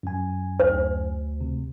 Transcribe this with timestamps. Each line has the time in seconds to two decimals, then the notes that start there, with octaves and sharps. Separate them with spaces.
0.03 F#2 G#5
0.60 D2 C5
1.41 C3